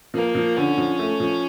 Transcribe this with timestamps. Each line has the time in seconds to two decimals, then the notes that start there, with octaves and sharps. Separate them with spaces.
0.14 F3 A#3
0.35 F3
0.57 D3 C#4
0.78 F3
0.99 A3
1.20 F3